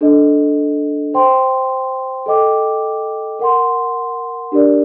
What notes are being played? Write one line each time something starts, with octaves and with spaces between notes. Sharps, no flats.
D4 A4 D#5
C5 G5 C6
A4 D#5 G5 D6
A#4 F#5 C6
D4 G4 A#4 D5